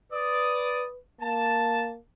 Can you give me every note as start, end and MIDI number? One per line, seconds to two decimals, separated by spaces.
0.12 0.99 71
0.12 0.85 74
0.12 0.85 87
1.21 1.97 58
1.21 1.92 81